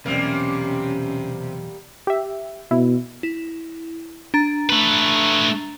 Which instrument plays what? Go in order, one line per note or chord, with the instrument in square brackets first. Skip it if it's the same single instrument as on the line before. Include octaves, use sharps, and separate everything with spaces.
[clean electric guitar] B1 E2 [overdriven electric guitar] C3 [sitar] G3 A#3 [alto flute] C#4
[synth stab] G4 E5
[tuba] B2 [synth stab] E4
[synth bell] E4
D4 A#5 A6
[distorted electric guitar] A3 B4